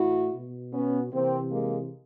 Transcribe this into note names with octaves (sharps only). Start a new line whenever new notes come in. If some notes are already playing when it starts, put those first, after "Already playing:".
Already playing: A2 E3 E4 F#4
B2
B3 C#4
C3 E3 A#3 C4
G#3 A#3